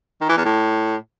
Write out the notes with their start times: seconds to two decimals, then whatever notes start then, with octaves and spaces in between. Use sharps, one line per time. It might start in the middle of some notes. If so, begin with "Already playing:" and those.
0.21 D#3
0.29 E3
0.37 E2
0.45 A2